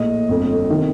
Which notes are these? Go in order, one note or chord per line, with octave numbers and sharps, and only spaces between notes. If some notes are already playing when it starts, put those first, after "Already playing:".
Already playing: A#1 A2 D#5
G1 F2 D3
C3 D#3